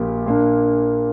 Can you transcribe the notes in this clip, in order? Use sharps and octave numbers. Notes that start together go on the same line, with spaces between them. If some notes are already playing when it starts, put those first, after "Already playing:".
Already playing: A#1 A#2 A#3 G4
A#2 A#3 D4